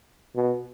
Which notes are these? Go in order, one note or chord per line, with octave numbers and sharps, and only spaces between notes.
B2